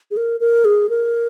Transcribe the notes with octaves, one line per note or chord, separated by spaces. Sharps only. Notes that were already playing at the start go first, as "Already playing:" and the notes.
G#4
A#4
A#4
G#4
A#4